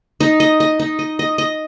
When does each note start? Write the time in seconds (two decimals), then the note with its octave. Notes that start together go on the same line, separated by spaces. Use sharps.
0.20 D#4
0.40 D#5
0.60 D#5
0.80 D#4
0.99 D#5
1.19 D#5
1.38 D#5